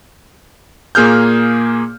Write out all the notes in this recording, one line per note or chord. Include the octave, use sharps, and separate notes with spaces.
A#2 A#3 G#4 F6 G6